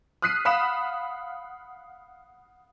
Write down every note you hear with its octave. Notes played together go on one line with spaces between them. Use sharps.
D#6 F6 F#6 B6 C7 D#7
F5 F#5 B5 D#6 B6 E7